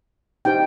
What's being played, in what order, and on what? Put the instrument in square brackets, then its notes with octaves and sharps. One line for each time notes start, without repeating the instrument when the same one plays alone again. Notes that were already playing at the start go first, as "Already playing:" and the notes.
[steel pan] D#4 G4 C5 G5